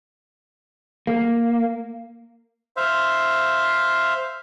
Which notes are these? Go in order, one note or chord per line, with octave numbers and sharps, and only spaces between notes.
A#3
C5 E5 F5